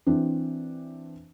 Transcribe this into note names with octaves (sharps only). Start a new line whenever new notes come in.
E3 C4 D4